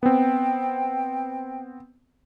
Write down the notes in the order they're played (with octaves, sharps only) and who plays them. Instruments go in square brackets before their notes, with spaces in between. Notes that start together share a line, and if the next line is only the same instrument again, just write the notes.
[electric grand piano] B3 C4 [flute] G5